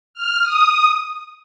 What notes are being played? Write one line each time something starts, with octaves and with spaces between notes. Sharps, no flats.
F6
D#6